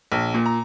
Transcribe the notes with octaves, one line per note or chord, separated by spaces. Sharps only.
A#1
A#2
A#5